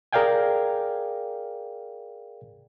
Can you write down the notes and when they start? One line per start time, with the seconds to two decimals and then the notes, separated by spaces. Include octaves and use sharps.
0.13 G#4 A#4 D5 F5 G5 G#5